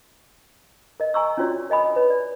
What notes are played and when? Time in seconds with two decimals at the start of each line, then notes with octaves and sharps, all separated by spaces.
1.00 A#4 D#5
1.14 D#5 G#5 A#5 C#6 E6
1.38 C#4 D4 F4 F#4 C#5 D5
1.70 A#4 D#5 G#5 B5 D#6
1.96 B4 C#5
2.10 D5